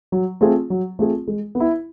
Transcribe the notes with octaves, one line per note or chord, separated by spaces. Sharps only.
F#3
A3 C4 F4 G#4
F#3
A3 C4 F4 G#4
G#3
B3
E4